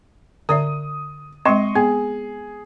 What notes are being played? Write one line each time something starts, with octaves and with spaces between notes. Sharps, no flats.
D3 D5 E5 D#6
G#3 C4 D#5 C6 C#6
B3 G#4